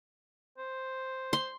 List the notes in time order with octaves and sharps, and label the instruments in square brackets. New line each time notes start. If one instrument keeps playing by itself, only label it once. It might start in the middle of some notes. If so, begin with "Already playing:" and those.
[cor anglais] C5
[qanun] C6